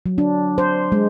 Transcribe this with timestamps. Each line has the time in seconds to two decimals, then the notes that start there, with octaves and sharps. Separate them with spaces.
0.06 F#3
0.18 D4
0.58 C5
0.92 G#3